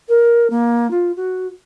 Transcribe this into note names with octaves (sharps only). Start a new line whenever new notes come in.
A#4
A#3
F4
F#4